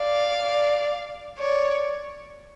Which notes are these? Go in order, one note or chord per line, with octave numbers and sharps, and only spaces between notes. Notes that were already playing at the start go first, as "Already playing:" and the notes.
Already playing: D5 F5
D5
C#5 D5